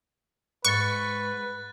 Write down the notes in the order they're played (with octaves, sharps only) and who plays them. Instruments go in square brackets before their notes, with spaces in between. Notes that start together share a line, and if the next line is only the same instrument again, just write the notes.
[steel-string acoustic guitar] G#2 [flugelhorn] B4 [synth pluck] C#6 [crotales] F#6 A6